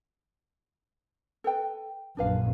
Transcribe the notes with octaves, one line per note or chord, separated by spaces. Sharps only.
A4 B4 G5
A#1 F#2 D4 B4 F5